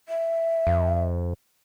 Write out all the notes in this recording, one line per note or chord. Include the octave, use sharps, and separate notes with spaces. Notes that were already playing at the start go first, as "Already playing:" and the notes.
E5
F2